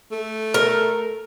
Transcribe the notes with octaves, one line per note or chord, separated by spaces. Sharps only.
A3
A#4